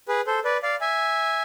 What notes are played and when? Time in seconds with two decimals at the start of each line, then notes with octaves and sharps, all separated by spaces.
0.08 G#4 B4
0.27 A4 C5
0.45 B4 D5
0.63 D5 F5
0.81 E5 G#5